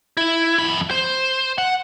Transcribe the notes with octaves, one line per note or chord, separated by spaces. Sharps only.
E4
F2 B5
C5
F#5